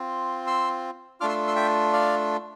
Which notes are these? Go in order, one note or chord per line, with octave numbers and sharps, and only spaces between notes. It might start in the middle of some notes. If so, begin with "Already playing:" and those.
Already playing: C4 F4
C6 E6
A3 D4 F4 D6 F6
C6 E6
C6 E6
E5 G5
D5 F5